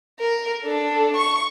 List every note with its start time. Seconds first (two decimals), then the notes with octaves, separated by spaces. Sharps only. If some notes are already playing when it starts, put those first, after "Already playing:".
0.20 A#4
0.63 D4 A4
1.16 C#6